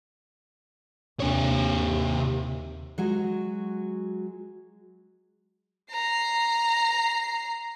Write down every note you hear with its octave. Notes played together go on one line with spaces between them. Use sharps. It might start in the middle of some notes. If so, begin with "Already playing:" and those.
D#2 C3 C#5
F#3 G#3 F#4
A#5 C7